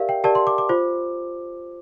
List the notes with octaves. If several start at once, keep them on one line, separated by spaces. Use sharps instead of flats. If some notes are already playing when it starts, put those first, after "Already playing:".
Already playing: G4 A#4 D5 E5 F5
G5
G4 A#4 D5 A5
C6
D6
D6
F4 C5